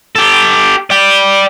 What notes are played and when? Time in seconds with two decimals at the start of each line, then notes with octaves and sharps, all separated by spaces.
0.16 G4 A4
0.90 D5 G5